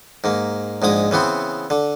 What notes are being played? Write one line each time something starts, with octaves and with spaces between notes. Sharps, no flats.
G#2 A#3
A#1 G#2 G#3 D#6
C#3 E3 B3 C4
D3